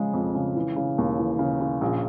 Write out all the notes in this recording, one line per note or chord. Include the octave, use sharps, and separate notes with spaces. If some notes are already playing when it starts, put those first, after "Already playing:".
Already playing: C#3 F3 G#3
F2
C#3
E3
C#3
D#2
E3
C#3
C#3
A#1